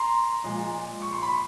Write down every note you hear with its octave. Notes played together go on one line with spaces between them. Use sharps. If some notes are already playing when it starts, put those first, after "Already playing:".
Already playing: A#5 C6
A#2 F3 G#3
C#6
C6
B5